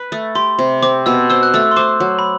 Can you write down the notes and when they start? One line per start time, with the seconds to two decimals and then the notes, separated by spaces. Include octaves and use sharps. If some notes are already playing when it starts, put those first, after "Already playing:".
Already playing: B4 B5
0.12 A3
0.35 G4 C6
0.59 C3
0.82 C4 D6
1.06 B2 E6
1.30 C5 E6
1.43 F#6
1.54 A3 E6
1.71 C6
1.76 C5 D6
2.00 F#3
2.19 B5